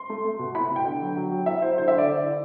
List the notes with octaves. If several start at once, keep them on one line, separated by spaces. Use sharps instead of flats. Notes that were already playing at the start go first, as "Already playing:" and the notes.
Already playing: C6
A3
A3
B2
E4 B5
B2
G5
D3
F#3
F#3
F#3
E4 E5
E4 C5
D3 C5
E5
D3
D5
D3
E4